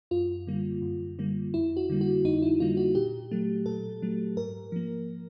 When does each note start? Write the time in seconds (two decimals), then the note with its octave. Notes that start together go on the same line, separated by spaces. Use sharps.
0.11 F#2 F4
0.47 D3 G3 A#3
0.82 F#2
1.19 D3 G3 A#3
1.54 F2 E4
1.77 F#4
1.90 D3 G3 A#3
2.01 F#4
2.24 F2 D#4
2.42 E4
2.60 D3 G3 A#3 F4
2.77 F#4
2.95 A#2 G4
3.31 F#3 A3
3.66 A#2 A4
4.02 F#3 A3
4.37 G#2 A#4
4.72 F3 A#3